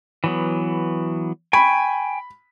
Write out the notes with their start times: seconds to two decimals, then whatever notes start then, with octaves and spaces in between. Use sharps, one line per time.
0.24 E3 F#3 B3
1.53 G5 G#5 B5 C#6